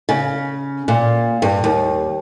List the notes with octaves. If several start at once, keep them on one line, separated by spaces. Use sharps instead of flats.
C#3
A#2
G2
D#2